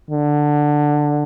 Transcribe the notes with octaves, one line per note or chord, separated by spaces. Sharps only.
D3